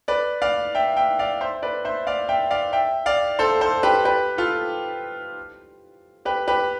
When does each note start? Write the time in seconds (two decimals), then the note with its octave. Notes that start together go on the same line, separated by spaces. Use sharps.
0.08 B4 D5
0.42 D5 F5
0.75 E5 G5
0.97 E5 G5
1.19 D5 F5
1.41 C5 E5
1.62 B4 D5
1.85 C5 E5
2.07 D5 F5
2.29 E5 G5
2.50 D5 F5
2.73 E5 G5
3.06 D5 F5
3.39 A4 C5
3.61 A4 C5
3.83 G4 B4
4.05 G4 B4
4.38 F4 A4
6.25 G4 B4
6.48 G4 B4